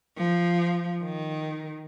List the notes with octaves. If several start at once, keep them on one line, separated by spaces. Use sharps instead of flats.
F3
D#3